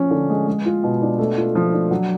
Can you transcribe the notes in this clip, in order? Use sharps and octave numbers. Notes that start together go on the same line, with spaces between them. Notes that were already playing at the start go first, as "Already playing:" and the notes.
Already playing: F3 C#4
D3
G#3
G#3
F4
B2
D4
A3
F4
F3
D4
F#3